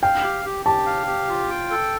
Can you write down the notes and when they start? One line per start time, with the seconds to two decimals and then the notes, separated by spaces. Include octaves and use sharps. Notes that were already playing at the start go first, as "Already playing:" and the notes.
0.02 F5 G5
0.23 G4
0.45 G4
0.66 G4 A5
0.86 F5
1.07 G4
1.28 F4
1.50 G5
1.70 A4